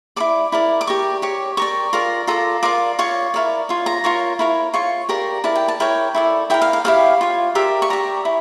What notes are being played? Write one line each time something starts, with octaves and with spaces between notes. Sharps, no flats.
E4 A4 D5 D6
E4 A#4 D5
D6
G4 A#4 D5 C#6
G4 C#5
G4 A#4 D5 C#6
F4 A#4 D5 A#5
F4 A4 D5 A#5
F4 A#4 D5 D6
F4 C#5 C#6
E4 A#4 D5
F4 C#5
A#5
F4 A#4 C#5 C#6
E4 A#4 C#5
F4 C#5 C#6
G4 A#4 D5 A#5
E4 A#4 D5 A5
G5
A5
E4 A#4 C#5 G5
E4 A4 D5
E4 G4 A#4 G5
F5
F5
E4 G4 C#5 F5
F4 C#5
G4 A#4 D5 E5
C#6
G4 D5 A#5
E4